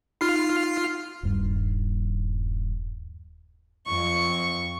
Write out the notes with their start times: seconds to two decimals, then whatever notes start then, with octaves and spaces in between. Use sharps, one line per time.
0.21 D#4 F4 F6 C7
1.23 D#1 G2
3.86 F2 C#6